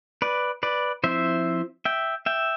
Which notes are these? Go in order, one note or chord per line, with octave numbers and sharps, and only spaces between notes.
B4 D5
B4 D5
F3 C4 E4 C5 E5
E5 G5
E5 G5